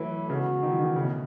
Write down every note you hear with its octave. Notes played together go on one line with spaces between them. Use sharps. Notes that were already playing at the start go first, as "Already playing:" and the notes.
Already playing: E3 F#3 A3 E4 B4
C#3 G#3 B3 F#4 A4
D#3
E3
D#3
C#3 A3
B2